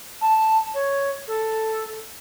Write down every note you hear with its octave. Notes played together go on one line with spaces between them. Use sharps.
A5
C#5
A4